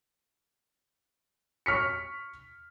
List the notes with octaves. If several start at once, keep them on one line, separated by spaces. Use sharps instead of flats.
C#6 F6 B6 C#7